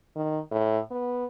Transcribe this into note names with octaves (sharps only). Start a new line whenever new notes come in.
D#3
A2
B3